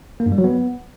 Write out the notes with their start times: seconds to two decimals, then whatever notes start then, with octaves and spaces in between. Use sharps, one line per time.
0.20 A#3
0.26 G2
0.32 G3
0.38 F#3
0.44 B3